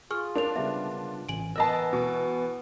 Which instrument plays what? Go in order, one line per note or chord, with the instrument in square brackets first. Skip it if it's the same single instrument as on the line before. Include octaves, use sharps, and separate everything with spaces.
[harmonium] F4 [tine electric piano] G#4 [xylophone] C#6 F6
[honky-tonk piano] D4 [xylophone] A#4 C#5 F7
[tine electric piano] C#3 G3 B3 [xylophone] E5
[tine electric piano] A1 G#5 [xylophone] D7 F#7
[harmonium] E3 B3 [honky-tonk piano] A#4 D#5 A5 [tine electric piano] E6 A#6 C7
[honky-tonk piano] B2